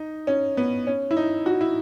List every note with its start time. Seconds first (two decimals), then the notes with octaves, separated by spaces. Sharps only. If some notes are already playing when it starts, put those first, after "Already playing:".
Already playing: D#4
0.27 C#4
0.57 B3
0.87 C#4
1.11 E4
1.17 D#4
1.46 F#4
1.61 E4